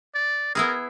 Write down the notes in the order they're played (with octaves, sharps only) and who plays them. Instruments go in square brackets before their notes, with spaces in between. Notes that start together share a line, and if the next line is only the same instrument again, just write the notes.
[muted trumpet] D5
[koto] B3 E4 G#4 [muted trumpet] A#4